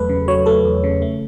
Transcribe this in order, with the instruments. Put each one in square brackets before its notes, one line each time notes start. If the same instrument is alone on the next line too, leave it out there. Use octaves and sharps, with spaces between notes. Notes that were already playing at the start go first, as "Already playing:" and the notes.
Already playing: [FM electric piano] E2 F#3 A3 A4 B4
C#3
F#3 C#5
A3 A4
E2
C#3
A3